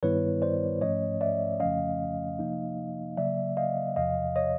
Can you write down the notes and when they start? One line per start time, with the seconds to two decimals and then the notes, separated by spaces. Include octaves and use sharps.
0.03 G2 D#3 G3 B3 E4 B4 C#5
0.42 C5 D5
0.81 G#2 F3 A3 C#4 C#5 D#5
1.21 D5 E5
1.60 F2 C#3 F3 A3 C#4 D#5 F5
2.39 C3 F3 A#3 D#4
3.17 C#3 F#3 A#3 D5 E5
3.57 D#5 F5
3.96 E2 C3 F3 D#5 F5
4.36 C#5 D#5